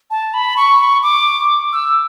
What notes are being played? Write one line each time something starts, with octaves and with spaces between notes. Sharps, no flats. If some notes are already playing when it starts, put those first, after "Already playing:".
A5
B5
C#6
D6
E6